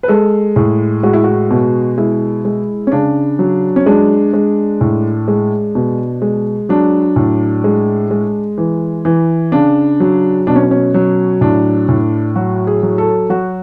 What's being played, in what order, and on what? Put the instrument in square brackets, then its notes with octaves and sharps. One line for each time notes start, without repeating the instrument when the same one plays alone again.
[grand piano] B4
G#3 A4
A2 G#4
G#3 F#4
E4
F#4
B2
G#3 E4
G#3
C#4
C#3 D4
F#3
C#4
G#3 D4
G#3
A2
G#3
B2
G#3
F#3 D4
A2
G#3
G#3
E3
E3
C#3 D4
F#3
B2 D4
C#4
C#4
F#3
A2 D4
A2
F#3 F#4
G#4
F#3
A4
F#3 F#4